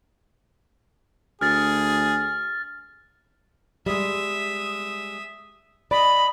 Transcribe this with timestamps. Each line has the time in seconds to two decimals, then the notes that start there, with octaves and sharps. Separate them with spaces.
1.41 D2 G#4 F6 A6
3.86 G3 G#3 E5 D#6
5.91 D5 D#5 B5